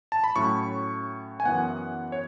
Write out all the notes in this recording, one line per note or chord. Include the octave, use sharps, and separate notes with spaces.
A5
B5
A2 F#3 C#4 C#6
G#5
F#2 E3 B3 F#5
C#5